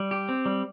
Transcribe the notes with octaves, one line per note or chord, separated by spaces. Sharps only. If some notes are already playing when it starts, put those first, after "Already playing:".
Already playing: G3
G4
C4
G3